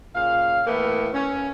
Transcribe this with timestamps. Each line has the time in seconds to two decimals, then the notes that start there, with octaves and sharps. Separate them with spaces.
0.15 A#2 C#3 F5
0.67 A2 E3 A#3 B3 E5
1.14 C#4